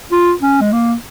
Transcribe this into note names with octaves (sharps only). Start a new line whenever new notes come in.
F4
C#4
G#3
A#3